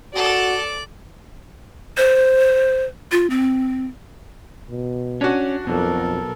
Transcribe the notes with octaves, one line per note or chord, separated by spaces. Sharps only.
F#4 A4 D5 D6
C5
F4
C4
B2
C#4 D4 F#4
B1 F2 B2 A4 A#4